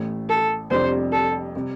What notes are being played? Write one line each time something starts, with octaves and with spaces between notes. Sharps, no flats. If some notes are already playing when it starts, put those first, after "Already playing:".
Already playing: A1 A2 A3
A4
F1 F2 C3 G3 D4 C5
A4
C3 G3